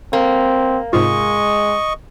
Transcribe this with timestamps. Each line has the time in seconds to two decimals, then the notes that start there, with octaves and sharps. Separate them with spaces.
0.13 A#3 C4
0.93 G#2 C3 G#3 F4 D#5 C#6